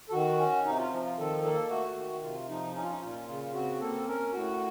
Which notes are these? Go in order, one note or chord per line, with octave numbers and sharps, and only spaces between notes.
A4
D#3 F#4
C#4
C3 D#4
F4
F3
F4
D#3 A4
A#3 A4
A3 F#4
D#3
C3 F4
F3 D#4
C#4 D#4
F4
D#4
A#2 F4
C#3 F4
C4 F#4
A#3 A4
C#4 A#4
A2 F#4